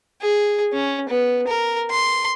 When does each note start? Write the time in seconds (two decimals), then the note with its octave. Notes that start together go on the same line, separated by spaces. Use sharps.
0.22 G#4
0.73 C#4
1.09 B3
1.47 A#4
1.91 C6